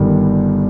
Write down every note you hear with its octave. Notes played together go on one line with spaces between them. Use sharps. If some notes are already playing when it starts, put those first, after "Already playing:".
Already playing: G1 G2 D#3 G3